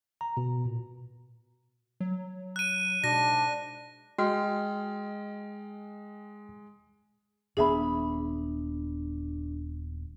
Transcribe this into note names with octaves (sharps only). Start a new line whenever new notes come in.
A#5
B2
A#2
F#3
F#6 D#7
G#2 B2 D4 A#6
G#3 F#4 D#5 G5 F6
D#1 B3 D4 G#4 E5 B5